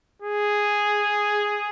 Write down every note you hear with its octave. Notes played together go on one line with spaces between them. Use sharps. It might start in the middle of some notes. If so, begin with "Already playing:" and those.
G#4